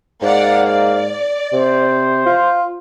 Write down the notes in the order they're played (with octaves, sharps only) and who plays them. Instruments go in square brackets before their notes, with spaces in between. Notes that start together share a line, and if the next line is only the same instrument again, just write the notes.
[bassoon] G#2 [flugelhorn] A#3 [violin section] D5 F5 F#5
[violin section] D5
[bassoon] C3 [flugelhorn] C5
[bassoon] F4